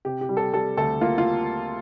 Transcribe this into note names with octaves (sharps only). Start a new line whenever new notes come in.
C3 G4
G4
G3
A4
G3 A4
D2 A4
A#3 F4
F4